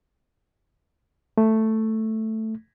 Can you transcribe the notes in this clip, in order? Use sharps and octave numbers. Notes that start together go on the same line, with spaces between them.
A3